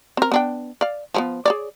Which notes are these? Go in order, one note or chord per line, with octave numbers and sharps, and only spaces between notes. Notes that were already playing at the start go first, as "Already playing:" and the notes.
C4 A#4
B3 D4 G5
D5 F5
F3 A3 B3
G#4 C#5 D5